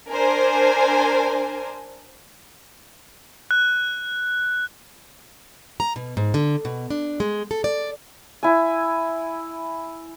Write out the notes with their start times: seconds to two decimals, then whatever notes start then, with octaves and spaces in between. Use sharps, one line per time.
0.10 D4 A#4 C5 G#5
3.51 F#6
5.80 A#5
5.96 B2
6.17 G#2
6.34 D3
6.65 B2
6.90 D4
7.20 G#3
7.51 A4
7.64 D5
8.43 E4 G#5